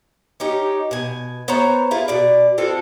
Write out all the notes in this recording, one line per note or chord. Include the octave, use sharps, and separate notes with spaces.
C#4 D#4 G4
B2 G#5
B3 C5 C#5 A#5
E4 F4 G#4
B2 D5
G#3 C4 F4 A4